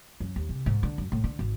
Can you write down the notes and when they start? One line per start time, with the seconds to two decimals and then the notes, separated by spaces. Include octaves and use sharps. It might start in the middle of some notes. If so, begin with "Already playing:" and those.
0.20 F#2
0.36 D#2
0.49 C3
0.66 G#2
0.83 D3
0.98 F#2
1.12 A2
1.24 D3
1.39 G#1